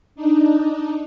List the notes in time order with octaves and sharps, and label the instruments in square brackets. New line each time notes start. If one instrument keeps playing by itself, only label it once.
[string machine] D4 D#4